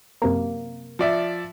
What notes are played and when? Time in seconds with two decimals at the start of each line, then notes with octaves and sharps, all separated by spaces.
0.22 F#2 C3 A#3
0.99 F3 D5 E5